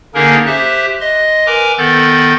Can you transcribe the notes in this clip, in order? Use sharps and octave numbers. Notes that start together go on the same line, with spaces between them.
D3 A#3 C#4 D#4 G#4 A#4
G4 C5 E5 F#6
D#5 C6
A#4 B4 G#5 A#5 D6
D#3 B3 A4 G6 A6